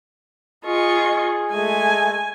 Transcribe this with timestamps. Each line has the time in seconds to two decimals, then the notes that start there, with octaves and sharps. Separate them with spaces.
0.65 F4 G#4 D#5 C#6
1.51 G#3 A3 G#5